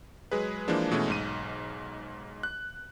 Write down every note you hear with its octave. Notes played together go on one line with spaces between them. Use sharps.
F#3 G#3 G#4 B4
E3 F3 G#3 A#3 D4
B2 E3 G#3 A3 C#4
B1 G#2 D#7
F#6